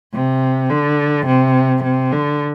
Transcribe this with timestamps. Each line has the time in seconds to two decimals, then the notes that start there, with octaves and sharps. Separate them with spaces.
0.14 C3
0.70 D3
1.26 C3
1.83 C3
2.12 D3